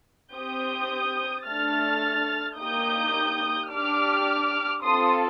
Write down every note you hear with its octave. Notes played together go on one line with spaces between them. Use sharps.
C4 G4 D#6 G6
A3 D4 A4 F6 A6
A#3 D#4 G4 D#6 G6
D4 G4 D6 F6
C4 F4 A4 C6 D#6